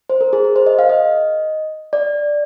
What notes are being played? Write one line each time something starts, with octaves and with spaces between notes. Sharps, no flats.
C5
A#4
G#4
A#4
C5
D#5
F5
D#5
D5